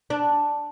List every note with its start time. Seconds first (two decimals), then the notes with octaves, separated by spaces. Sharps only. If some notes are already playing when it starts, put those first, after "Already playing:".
0.10 D4